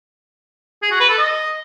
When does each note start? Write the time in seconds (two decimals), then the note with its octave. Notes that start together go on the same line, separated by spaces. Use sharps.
0.82 G#4
0.91 F#4
1.00 B4
1.09 A4
1.18 D#5